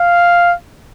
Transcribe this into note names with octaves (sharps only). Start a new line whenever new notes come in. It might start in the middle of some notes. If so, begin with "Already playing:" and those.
Already playing: F5